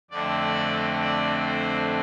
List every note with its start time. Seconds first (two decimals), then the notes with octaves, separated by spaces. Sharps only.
0.11 F2 D3 A3 C4 D5
1.01 D5
1.45 C5